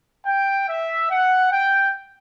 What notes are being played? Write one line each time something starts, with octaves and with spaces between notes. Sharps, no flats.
G5
E5
F#5
G5